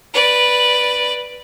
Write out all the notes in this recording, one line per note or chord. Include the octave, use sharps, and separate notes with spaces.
B4 D5